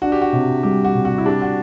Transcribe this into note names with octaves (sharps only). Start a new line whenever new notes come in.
D4 F#4
G4
F#4
C3
G3 G4
F#4
C3
F#4
E4
D4 G4
F#4